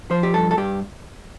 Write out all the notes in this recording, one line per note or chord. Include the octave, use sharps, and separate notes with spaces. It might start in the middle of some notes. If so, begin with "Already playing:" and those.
F3 C5
G4
G2 A4
A4
G2 G4